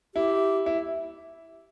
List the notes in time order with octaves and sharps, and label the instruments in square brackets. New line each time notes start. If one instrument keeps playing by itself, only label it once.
[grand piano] E4 [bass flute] G4
[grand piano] E4